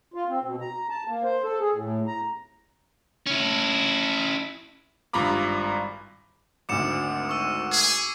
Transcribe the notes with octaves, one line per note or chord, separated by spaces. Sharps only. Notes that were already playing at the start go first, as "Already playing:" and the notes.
F4
C4
B2
A#5
A5
A#3
C5
A4
G#4
A2
A#5
C#4 E4
G#1 G2 F4 A#5 B5 D6
G#1 D2 D6 C#7 E7
C#6 E6 D#7
G#4